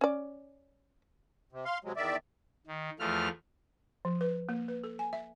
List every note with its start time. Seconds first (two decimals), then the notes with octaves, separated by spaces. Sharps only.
0.01 C#4 D5
1.52 C3
1.65 F5 C6
1.84 C3 F#3 G#3
1.96 E2 D#3 D5 E5
2.67 D#3
2.99 E2 F3 A3 F6
4.05 F3
4.21 B4
4.49 A#3
4.68 B4
4.84 A4
4.99 G#5
5.13 E5